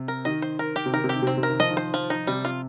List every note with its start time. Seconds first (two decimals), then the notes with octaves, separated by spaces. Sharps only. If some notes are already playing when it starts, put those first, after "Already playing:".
Already playing: C3
0.08 A#4
0.25 D#3 D#5
0.42 C5
0.59 A#4
0.76 G4
0.86 C3
0.93 D#3 A#4
1.04 C3
1.09 G4
1.16 D#3
1.22 C3
1.27 D#3 C4
1.38 C3
1.43 A#4
1.50 D#3
1.60 F3 D#5
1.70 D#3
1.77 C5
1.94 F3
2.10 D#4
2.27 C3 G3
2.45 F4